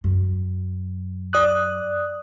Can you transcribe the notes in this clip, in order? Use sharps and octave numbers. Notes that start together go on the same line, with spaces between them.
F#2
D5 D#6 F#6